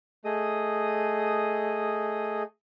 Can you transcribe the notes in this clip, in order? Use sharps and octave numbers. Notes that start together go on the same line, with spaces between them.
A3 G#4 D#5 D#6